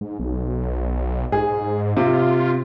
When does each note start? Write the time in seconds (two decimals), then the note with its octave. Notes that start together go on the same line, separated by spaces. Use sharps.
0.01 G#2
0.19 B1
1.32 G#2 G#4
1.97 C3 F4